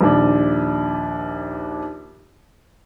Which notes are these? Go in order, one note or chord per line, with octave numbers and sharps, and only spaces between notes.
A#1 D#2 D4